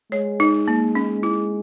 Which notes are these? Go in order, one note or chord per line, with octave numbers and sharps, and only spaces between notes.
G#3 C#5
D#4
A#3
C#4
E4